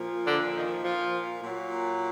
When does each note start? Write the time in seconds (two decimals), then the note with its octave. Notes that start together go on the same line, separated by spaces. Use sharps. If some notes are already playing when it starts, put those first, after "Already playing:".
Already playing: A#2 F3
0.25 D3 D4
0.54 D#3 D#4
0.82 F3 F4
1.40 A#2 F#3